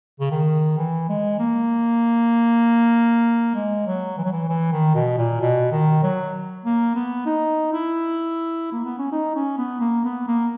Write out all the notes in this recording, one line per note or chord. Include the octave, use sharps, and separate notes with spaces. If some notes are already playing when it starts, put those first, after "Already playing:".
C#3
D#3
E3
G#3
A#3
G#3
F#3
E3
F#3
E3
E3
D#3
B2
A#2
B2
D#3
F#3
A#3
B3
D#4
E4
A#3
B3
C#4
D#4
C#4
B3
A#3
B3
A#3